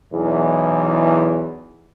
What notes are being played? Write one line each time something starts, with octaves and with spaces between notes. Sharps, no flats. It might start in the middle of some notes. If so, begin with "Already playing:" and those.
B1 E2